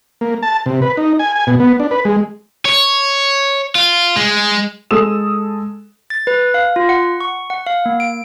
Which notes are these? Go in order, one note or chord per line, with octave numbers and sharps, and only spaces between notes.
A#3
A5
C3
B4
D#4
G#5
G#5
B2
B3
D4
B4
G#3
C#5
F4
G#3
G#3 A4 D#6 E6 E7
A6
B4
F5
F4
F#5
C#6
F#5
F5
A#3
D7